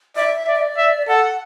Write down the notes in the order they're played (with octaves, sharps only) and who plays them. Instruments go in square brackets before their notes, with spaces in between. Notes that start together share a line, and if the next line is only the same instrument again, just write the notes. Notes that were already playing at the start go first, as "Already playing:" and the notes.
[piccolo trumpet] D5 [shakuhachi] E5
[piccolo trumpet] D5
[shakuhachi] E5
D5
[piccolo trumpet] E5
[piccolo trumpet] A4 [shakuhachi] F#5